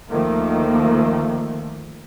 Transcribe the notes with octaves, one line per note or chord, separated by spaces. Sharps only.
D2 D#3 F3 A3 A#3